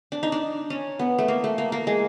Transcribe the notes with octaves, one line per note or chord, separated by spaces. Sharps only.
D4
D#4
D4
C#4
B3
A3
A#3
A3
A#3
A#3
G#3